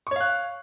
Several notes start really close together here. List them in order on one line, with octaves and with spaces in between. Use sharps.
C#6 C#5 F5 F#6